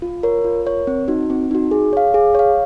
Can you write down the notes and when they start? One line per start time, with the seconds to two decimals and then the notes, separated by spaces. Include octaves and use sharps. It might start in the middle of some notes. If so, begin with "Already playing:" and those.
0.02 F4
0.23 A#4 C#5
0.44 F4
0.66 A#4 C#5
0.87 C4
1.08 D#4 F#4
1.30 C4
1.51 D#4 F#4
1.71 G#4
1.93 C#5 F5
2.14 G#4
2.35 C#5 F5